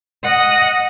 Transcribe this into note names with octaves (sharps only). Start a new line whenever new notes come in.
D#5 F#5